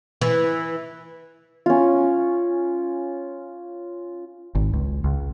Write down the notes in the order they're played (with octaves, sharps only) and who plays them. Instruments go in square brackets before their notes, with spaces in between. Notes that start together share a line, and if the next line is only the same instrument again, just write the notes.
[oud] E3
[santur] C#4 F4
[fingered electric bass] G#1
C#2
C#2